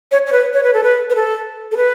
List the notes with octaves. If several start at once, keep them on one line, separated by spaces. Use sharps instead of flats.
C#5
C#5
B4
C#5
B4
A4
B4
B4
A4
A4
B4